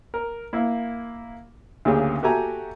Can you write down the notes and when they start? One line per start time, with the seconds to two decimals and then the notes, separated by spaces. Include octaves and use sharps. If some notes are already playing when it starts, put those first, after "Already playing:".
0.14 A#4
0.53 A#3 E4
1.85 D2 C#3 A#3 C#4 G4 G#4
2.23 F#4 G4 A4 E5 G#5 A#5